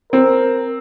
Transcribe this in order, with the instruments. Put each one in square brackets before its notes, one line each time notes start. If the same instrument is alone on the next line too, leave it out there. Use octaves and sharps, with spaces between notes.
[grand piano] C4 [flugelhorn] A#4